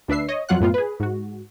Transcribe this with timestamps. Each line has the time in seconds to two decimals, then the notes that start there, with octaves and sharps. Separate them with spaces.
0.08 D2 D4 B4 E5 C7
0.28 C#5 D#5
0.49 F2 F#3 F4 F#5 F#6
0.60 F#2 A2 B3 F4
0.74 G#4 B4
1.00 G#2 F#4